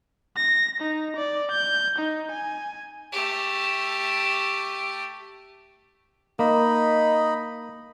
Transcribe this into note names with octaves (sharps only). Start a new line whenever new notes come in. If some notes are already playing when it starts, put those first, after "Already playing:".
A#6
D#4
D5
G6
D#4
G#5
A3 G4
A#3 D#4 D#5 B5